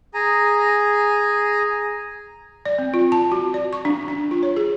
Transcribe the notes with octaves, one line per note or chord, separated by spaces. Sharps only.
G#4 G#5 A#5
D5
C4
F4
A5
F#4
D5
C#6
D4
D4
F4
C#5
G#4